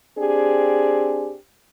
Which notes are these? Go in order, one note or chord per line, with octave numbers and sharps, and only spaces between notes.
C4 D4 G4 G#4